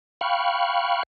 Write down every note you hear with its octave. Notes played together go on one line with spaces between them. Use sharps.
F5 G5 B5 C#6 F6 F#6